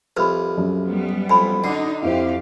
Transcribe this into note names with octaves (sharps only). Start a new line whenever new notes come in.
C2 F2 B4 B5 F6
F#2
G3 B3
F2 G#5 B5
D3 D4 D#4 F#5
F2 C4 E4 G4 F5